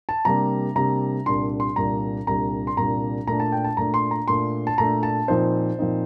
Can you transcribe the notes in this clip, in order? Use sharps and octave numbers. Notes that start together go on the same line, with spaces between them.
A5
C3 G3 A#3 D4 A#5
C3 G3 A#3 D4 A#5
C2 A#2 G3 D4 C6
C6
C2 A#2 G3 D4 A#5
C2 A#2 G3 D4 A#5
C6
C2 A#2 G3 D4 A#5
A#2 A3 D4 A#5
A5
G5
A5
A#2 A3 D4 A#5
C6
A#5
A#2 A3 D4 C6
A5
A#2 A3 D4 A#5
A5
A#2 F3 C4 D#4 C5
A#2 F3 C4 D#4